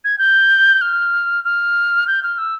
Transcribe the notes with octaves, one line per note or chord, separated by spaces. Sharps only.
G#6
G6
F6
F6
G6
F6
E6